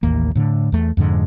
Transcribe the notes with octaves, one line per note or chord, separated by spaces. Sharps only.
A1 D#2 A#3
A2 D3
E2 A3
F2 G#2 D3 G#3